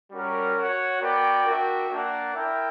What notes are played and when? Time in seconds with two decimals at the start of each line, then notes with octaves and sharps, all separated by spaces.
0.12 G3 C#4 F#4 A#4
0.56 F#4 C#5 F#5
1.01 B3 F#4 A#4 D5 G5
1.45 D4 F#4 A#4 E5 G5
1.91 A#3 D4 A#4 D5 F#5
2.35 E4 A#4 E5 G5